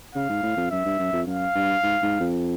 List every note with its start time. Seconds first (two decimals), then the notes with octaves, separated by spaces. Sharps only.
0.15 C#3 F5
0.30 G#2
0.43 A2
0.57 F2
0.71 F#2 E5
0.85 G2
0.99 F#2
1.13 F2
1.27 F#2 F5
1.55 G2
1.83 G#2
2.02 G#2
2.20 F2